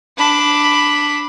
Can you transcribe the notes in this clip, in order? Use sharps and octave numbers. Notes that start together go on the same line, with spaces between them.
D4 B5